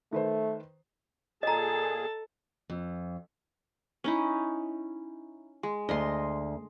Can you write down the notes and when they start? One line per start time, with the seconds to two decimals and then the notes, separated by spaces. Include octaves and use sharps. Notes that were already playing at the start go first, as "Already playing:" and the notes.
0.13 D#3 A3 B4 C5
1.43 A#2 G#4 A4 D#5 A5 A#5
2.70 F2
4.04 C#4 D#4 E4
5.63 G#3
5.89 D2 D#5 C6